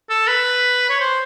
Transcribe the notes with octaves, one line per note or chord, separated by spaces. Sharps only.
A4
B4
C#5
C5